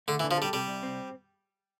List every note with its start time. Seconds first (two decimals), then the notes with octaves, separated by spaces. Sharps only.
0.08 D3 A3
0.20 E3
0.24 D3
0.31 F3
0.38 G3 A4
0.53 C3 G3
0.68 C2
0.83 C4